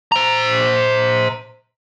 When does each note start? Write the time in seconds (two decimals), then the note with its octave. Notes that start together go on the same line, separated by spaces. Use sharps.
0.12 C5 A#5